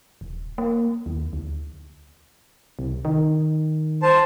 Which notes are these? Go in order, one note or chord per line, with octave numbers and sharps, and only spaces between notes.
D#1
A#3
D#2
D2
C2
D#3
C5 A5